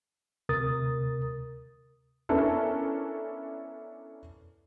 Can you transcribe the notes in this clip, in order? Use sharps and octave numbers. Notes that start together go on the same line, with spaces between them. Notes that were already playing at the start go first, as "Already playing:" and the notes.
D2 C3 A#4 D#6 A6
B3 C#4 D4 E4 A4 A#4